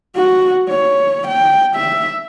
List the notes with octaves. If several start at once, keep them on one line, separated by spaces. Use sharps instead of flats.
F#4
C#5
G5
E5